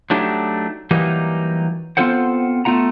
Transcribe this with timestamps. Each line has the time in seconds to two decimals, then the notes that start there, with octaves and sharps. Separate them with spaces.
0.10 F#3 A3 D4 D#4 G4
0.91 E3 F#3 G3 A#3 D#4 G4
1.97 B3 C4 F4 A4 C5 F#5
2.65 A3 B3 F4 F#5 A#5